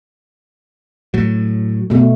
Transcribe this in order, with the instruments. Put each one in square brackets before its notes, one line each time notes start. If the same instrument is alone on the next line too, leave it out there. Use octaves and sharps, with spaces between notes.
[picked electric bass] A2 F#3
[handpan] B2 A3